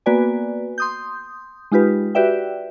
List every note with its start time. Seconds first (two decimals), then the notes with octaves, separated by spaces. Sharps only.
0.06 A#3 B3 F#4 B4 D5 G#5
0.78 C6 D#6 G6
1.72 G#3 D#4 F4 G4 B4
2.15 F#4 G4 B4 D5 E5 G5